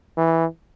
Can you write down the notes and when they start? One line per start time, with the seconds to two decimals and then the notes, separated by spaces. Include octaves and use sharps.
0.17 E3